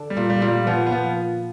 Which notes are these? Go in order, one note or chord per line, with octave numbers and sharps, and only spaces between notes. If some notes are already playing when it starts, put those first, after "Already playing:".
Already playing: D3 D4
G3
A#2 A#3
G3
A#2 A#3
G3
F3 B3
B3
F3